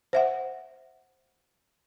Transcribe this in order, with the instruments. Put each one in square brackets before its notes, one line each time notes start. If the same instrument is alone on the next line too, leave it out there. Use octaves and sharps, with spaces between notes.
[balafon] C5 E5 F#5